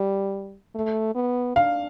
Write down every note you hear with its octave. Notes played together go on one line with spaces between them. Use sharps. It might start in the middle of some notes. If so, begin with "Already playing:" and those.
Already playing: G3
A3
B3
D4 F5